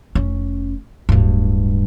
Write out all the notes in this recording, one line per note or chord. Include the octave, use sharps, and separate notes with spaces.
F1 C#4
D1 G2